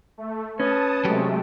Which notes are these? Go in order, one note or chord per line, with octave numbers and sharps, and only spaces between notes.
A3
C#4 B4 A5 D#6
C3 F#3 G#3 A3 G4